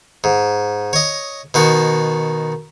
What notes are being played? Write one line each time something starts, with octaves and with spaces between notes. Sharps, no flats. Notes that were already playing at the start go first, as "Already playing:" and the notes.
G#2
C#5 D#5
B2 D#3 F#4